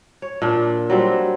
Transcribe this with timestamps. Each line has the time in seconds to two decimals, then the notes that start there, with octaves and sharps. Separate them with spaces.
0.22 C#5
0.42 A#2 D4
0.90 F#3 G3 C4